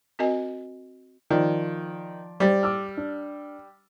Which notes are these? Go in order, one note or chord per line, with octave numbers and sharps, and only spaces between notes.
C4 F#4 A#4 D#5 G#5
D#3 F3 D5
G3 C5 D5 A6
D6 E6 F6
D4